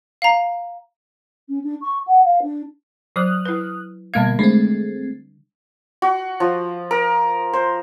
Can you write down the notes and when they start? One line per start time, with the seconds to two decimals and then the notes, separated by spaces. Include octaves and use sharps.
0.22 F5 A#5
1.49 C#4
1.64 D4
1.81 C#6
2.07 F#5
2.25 F5
2.42 D4
3.16 F#3 C5 D#6 F6 F#6
3.46 E4 B4
4.14 B2 D3 G3 A#3 F5 G#6
4.39 G#3 A3 C4 D4
6.02 F#4
6.40 F3
6.91 A#4
7.53 C5